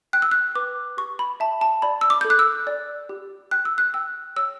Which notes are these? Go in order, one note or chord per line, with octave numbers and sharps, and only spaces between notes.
G5 F#6
E6
F#6
B4 D6
G4 C#6
B5
E5 A5
A5
D5 B5
E6
D6
A4 G6
F#6
E6
D5
G4
G5 F#6
E6
F#6
G5 E6
C#5 E6